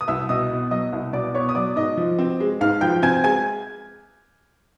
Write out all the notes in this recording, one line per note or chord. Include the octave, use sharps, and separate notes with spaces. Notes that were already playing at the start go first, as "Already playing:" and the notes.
D#6
C2 E5 E6
B2 D#5 D#6
B3
F#3 D#5 D#6
C2
B2 D5 D6
B3 C#5 C#6
D#6
F#3 D5 D6
G#2 D#5 D#6
F3
C4
G#3
G#2 F5 F6
F3 G5 G6
C4 G#5 G#6
G#3 G#5 G#6